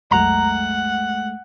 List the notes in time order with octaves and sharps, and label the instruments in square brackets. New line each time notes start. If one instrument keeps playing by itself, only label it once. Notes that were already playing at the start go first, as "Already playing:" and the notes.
[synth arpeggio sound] B1 F2 F#3 [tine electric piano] G#3 A3 [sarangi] F#5 [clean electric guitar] A#5